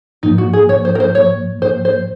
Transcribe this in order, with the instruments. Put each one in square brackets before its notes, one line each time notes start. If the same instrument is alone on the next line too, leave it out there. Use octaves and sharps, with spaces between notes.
[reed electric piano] G#2 F3 A#3 [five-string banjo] D#4
[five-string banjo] F#4
G#4
[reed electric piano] G#2 F3 A#3 [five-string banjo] C#5
[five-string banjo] C5
A#4
C5
[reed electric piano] G#2 F3 A#3 [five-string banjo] C#5
[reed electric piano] G#2 F3 A#3 [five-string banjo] C5
[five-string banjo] C5